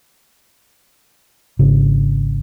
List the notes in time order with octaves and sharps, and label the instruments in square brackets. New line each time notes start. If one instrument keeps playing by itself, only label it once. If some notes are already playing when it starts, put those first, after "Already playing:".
[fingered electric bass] G#1 C#3